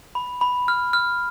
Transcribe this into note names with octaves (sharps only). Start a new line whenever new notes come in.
B5
B5
F6
F6